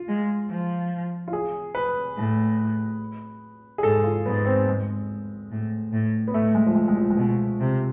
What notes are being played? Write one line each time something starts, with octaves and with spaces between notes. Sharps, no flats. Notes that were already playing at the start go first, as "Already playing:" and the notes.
Already playing: F4
G#3
F3
F4
G#4
B4
A2
G#4
G#2 A4
F4
G#2 B3
C4
G#3
A2
A2
B3
A2 A3
G#3
F3
G#3
G#3
F3
G#3
B2 F3
C3